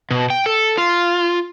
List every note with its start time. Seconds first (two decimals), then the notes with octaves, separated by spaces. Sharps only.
0.11 B2
0.30 G5
0.46 A4
0.78 F4